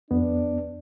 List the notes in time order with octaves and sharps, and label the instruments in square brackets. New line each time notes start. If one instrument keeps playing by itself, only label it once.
[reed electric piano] F2 B3 [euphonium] D4